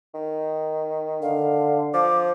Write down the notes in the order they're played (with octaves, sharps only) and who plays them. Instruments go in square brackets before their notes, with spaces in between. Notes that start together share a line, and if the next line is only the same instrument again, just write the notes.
[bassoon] D#3
[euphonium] D3 [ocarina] F5
[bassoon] F3 [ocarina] D6